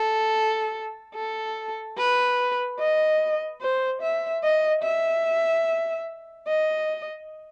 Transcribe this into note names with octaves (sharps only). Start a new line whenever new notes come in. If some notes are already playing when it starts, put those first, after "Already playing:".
Already playing: A4
A4
B4
D#5
C5
E5
D#5
E5
D#5